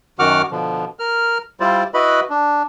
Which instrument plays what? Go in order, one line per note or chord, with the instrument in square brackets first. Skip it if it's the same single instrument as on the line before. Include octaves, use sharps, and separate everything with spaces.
[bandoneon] F#2 D#3 F#4 F#5 D6 F6
B2 D3 F3
A#4 F6
G3 E4 F4 C5 D5
E4 F#4 B4 D#5 B5
D4